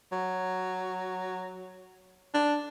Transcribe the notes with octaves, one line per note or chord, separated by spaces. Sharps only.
F#3
D4